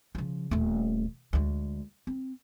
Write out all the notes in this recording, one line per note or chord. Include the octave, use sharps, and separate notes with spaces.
C#3 F3
D#1 A3
D2 G#3
C4